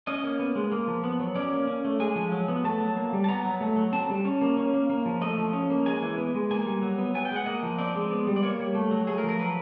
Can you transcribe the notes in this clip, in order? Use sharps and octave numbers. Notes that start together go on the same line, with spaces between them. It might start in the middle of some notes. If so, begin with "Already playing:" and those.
C#4 D#5
A#3
B3
G#3
A#3
F3
B3
F#3
C#4 D5
A#3
C#4
A3
G#3 G#5
F3
F#3
B3
A3 A5
F#3
A#3
G3
A5
B3 A#5
F#3
A3
F#3
C4 A5
G3
C#4
A#3
C#4
A#3
A#3
F3
A3 D#5
F3
C#4
A#3
G#3 G#5
E3
B3
G#3
A#3 G#5
G3
F#3
B3
B3 G#5
G5
G#3 F#5
A#3 D#5
F3
C4 D5
G#3
B3
G3
D5
A#3 C#5
G3
A3
F#3
A3 G#4
A#4
F3
A#4
F#3 B4